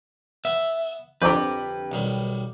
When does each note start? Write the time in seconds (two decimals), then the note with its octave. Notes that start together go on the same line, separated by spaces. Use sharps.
0.45 B3 E5
1.22 F2 D3 G4 B4 A#5 B5 D6 G6
1.92 B1 D#3 G3